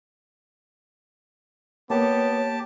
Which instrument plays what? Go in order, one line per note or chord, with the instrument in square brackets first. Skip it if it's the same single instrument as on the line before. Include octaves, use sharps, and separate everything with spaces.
[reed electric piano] A#3 [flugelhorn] B3 [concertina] G4 A5 [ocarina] C#5